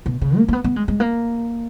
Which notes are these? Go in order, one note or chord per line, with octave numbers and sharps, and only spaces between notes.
B2
C#3
A#3
A#3
B3
B3
G#3
G#3
A#3